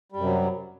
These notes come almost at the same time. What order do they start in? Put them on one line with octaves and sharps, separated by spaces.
G3 F#2 C3 F#3